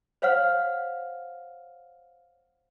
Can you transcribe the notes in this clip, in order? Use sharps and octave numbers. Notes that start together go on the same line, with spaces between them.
C5 C#5 F5 F#5 F6